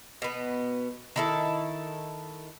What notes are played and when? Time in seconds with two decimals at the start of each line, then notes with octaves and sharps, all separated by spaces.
0.22 B2 B3
1.16 D#3 E4 A4